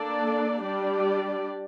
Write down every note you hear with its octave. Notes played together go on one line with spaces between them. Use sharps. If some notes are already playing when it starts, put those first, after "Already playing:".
Already playing: A#3 D4 A4 D5
G3 D4 G4 D5